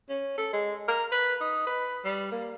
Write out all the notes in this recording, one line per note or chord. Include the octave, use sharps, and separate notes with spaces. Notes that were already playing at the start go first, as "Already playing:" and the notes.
C#4
A4
G#3
A#4
B4
D#4
B4
G3
A#3